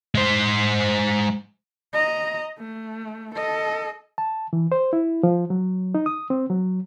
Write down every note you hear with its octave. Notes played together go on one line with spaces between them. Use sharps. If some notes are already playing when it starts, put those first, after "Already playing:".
G#3 C5
D#5 A#5
A3
A4 D#5
A5
E3
C5
E4
F3
F#3
D#4
D#6
C4
F#3